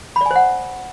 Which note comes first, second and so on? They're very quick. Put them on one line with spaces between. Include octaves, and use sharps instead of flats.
B5 D5 G#5 C5 F#5